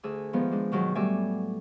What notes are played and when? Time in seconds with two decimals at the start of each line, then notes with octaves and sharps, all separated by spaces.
0.03 D2 G#4 G#5 E6
0.33 D#3 F3 G#3 B3
0.51 G#3 D4
0.72 B2 D#3 F#3 G#4
0.95 A2 F#3 G3 D5 E5 G#5